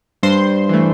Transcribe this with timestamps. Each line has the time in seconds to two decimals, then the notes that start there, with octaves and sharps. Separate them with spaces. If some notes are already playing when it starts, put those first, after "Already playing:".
0.23 G2 C5 C6
0.69 E3 A3